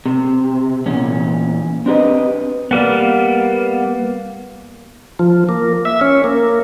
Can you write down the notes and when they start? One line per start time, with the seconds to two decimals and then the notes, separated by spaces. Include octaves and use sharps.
0.06 C3
0.86 E2 A#2 C#4
1.86 C4 D4 G4 B4 D#5
2.71 G3 A#3 B3
5.19 F3
5.49 A#3
5.85 E5
6.01 C#4
6.24 A#3